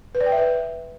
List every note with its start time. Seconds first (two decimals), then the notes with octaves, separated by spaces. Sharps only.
0.15 B4
0.20 D5
0.26 G5
0.32 E5
0.38 B4